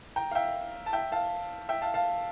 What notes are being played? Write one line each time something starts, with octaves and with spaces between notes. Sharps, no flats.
G5 A#5
F5
E5 G5
A5
E5 G5
F5 A5
E5 G5
F5 A5
F5 A5